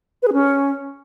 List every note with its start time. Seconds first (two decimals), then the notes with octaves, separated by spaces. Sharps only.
0.23 B4
0.28 G#4
0.33 C#4